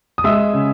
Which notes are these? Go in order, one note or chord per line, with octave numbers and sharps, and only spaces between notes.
D#6
G#3 E5 E6
C#3